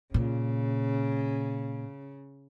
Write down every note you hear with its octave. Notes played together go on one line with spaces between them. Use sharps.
A#2 C#3